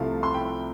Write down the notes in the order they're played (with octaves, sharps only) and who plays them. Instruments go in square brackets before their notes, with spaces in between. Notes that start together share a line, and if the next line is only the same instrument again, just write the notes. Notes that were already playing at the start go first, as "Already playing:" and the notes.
Already playing: [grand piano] C2 C3 F3 A3 E4 [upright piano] F5
[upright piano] C6
G5 B5